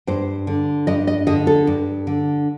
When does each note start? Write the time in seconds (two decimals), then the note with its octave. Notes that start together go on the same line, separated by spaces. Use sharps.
0.07 G2 C5
0.47 D3
0.87 G2 D#5
1.07 D#5
1.27 D3 D#5
1.47 A4
1.67 G2
2.07 D3